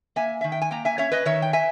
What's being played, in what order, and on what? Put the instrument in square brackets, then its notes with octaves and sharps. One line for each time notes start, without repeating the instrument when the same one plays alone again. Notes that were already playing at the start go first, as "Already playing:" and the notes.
[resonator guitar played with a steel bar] A#3 E5 G#5
D#3 E5
G5
G#5
A#3 G5 A#5
E5 G#5
C#4 C#5 E5
B4 D#5
D#3 C#5 E5
G5
E5 G#5